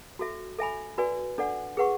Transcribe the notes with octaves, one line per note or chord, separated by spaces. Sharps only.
F#4 A4 E5
A4 E5 G#5 B5
F#4 B4 D5 G#5
D4 A4 D5 F#5
G#4 B4 F#5 C#6